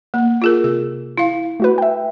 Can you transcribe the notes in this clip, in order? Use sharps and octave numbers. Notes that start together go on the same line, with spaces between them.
A#3
F4 G#4 A#4
C3 G#4
E4 F5
A3 F#4 B4
E5 G5